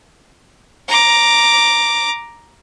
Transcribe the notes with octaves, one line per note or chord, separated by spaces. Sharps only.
A#5 D6